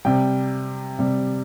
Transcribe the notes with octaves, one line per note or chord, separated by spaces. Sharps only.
C3 G3 G5
C3 G3